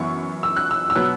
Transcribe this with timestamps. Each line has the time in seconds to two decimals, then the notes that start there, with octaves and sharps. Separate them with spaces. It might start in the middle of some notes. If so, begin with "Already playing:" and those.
Already playing: F#2 E3 B3 C#6
0.43 E6
0.57 F#6
0.71 E6
0.90 E6
0.95 B2 F#3 B3 F#6